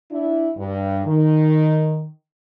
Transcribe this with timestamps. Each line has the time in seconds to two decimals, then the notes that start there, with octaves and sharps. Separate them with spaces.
0.11 D4 E4
0.57 G2
1.06 D#3